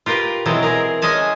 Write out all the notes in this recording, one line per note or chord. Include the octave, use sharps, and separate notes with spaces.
F4 G4 A#4 B4
B2 E3 F#3 G#3 C4
G#4 A#4
G#3 C#4 D#5 G#5 A5